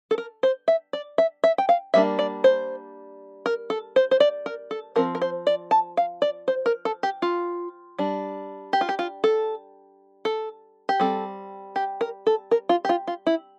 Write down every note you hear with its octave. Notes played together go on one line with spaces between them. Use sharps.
A4
A#4
C5
E5
D5
E5
E5
G5
F5
G3 A#3 D4 E5
D5
C5
A#4
A4
C5
C5
D5
A#4
A4
F3 C4 A#4
A#4
C5
D5
A5
F5
D5
C5
A#4
A4
G4
F4
G3 D4
G4
F4
G4
F4
A4
A4
G4
G3 C4 A4
G4
A#4
A4
A#4
F4
G4
F4
F4
E4